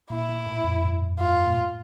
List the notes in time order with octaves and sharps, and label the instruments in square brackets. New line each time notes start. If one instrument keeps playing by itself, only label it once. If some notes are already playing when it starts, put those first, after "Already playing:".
[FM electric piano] A#2 [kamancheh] E4
[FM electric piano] A#2
A2
F2
G2
[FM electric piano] G2 [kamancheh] F4
[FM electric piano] A#2
A2